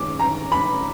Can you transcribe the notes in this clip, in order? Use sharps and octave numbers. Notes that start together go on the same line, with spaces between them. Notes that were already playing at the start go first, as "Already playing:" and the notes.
Already playing: F#2 D#3 G#3 D6
A#5
B5